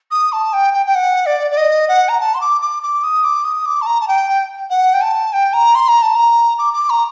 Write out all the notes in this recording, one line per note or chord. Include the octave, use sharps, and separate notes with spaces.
D#6
A5
G5
G5
G5
F#5
D5
D5
D#5
F#5
A#5
A5
C6
D6
D6
D6
D#6
D6
D#6
D6
A5
A#5
A5
G5
F#5
G5
A5
G5
A#5
C6
A#5
A5
A#5
D6
D6
A#5